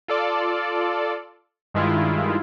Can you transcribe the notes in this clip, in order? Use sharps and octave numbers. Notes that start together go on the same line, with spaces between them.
F4 A4 D5
G2 D#3 G#3 E4 F4